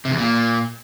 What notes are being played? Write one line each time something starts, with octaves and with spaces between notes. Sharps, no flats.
C3
E2
A#2